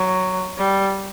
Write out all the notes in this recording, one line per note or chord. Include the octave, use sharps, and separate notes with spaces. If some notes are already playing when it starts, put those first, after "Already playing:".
Already playing: F#3
G3